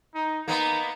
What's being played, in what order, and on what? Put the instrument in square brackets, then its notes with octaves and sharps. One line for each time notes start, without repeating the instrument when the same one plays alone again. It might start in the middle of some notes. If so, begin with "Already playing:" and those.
[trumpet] D#4
[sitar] A#3 B3 [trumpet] D#4